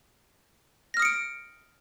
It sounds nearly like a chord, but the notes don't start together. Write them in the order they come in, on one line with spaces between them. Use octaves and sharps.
A#6 F6 D#6 C#7 D7